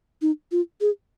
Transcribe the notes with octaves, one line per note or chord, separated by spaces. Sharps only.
D#4
F4
G#4